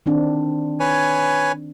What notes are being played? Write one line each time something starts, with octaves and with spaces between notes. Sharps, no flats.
D#3 C4 D4
B4 C#5 G#5